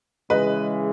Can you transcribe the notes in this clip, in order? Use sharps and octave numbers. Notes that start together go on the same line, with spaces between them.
C#3 E3 G#3 B4 D#5